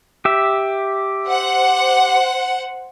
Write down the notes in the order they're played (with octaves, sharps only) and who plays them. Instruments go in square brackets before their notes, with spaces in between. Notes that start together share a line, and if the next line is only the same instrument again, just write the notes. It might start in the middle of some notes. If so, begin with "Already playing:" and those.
[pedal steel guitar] G4 E5
[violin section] C5 F#5